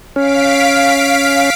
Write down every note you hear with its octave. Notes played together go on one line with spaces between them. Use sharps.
C#4 F5 B6 D7